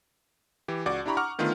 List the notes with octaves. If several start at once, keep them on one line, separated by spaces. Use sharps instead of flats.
E3 G4
C#2 F#4 D5 D6
D4 E4 G4 A#5 B5 C#6
F#5 A#5 C#6 D6 F6
D3 D#3 A3 B3 F4